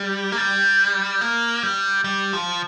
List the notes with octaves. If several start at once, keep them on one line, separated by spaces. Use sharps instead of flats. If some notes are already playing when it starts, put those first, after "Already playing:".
Already playing: G3
A#3
G3
A#3
G3
G3
F3